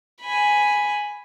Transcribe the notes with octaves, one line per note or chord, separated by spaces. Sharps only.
G#5 B5